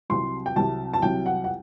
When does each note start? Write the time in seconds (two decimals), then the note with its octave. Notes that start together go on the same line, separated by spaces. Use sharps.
0.09 C2 C3 F#3 C6
0.46 G5
0.56 C2 C3 F#3 A5
0.93 A5
1.02 C2 C3 F#3 G5
1.26 F#5
1.44 F#5